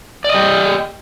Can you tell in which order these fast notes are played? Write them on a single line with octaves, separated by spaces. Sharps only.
D5 D#5 G4